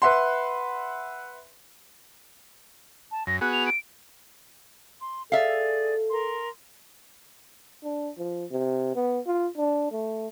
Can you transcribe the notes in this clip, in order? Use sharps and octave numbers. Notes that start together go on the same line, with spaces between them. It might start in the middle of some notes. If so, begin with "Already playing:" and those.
B4 E5 F#5 C6
A5
F#2 A#6
B3 F#4 G#4 F#6
F7
D7
C6
G#4 A4 D5 E5 F5
A#4 C6
D4
F3
C3
B3
F4
D4
A3